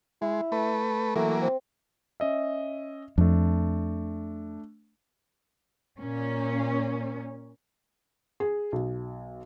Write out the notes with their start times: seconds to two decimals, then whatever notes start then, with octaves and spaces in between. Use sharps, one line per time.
0.22 G#3 E4
0.52 A3 B4
1.16 E3 F#3 A3 A#3
1.42 C4
2.20 C#4 D#5 E5
3.18 F2 A3 D4
5.99 A#2 C#4
8.40 G#4
8.72 B1